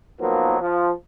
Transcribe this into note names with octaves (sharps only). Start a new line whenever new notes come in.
B2 D#3 F3 F#3 A#3 B3
F3